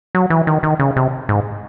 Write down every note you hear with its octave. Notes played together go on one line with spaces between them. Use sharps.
F#3
E3
D#3
D#3
C#3
C3
G#2